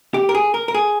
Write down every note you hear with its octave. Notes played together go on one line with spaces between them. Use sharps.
G4
A#4
G#4
A#4
A#4
G#4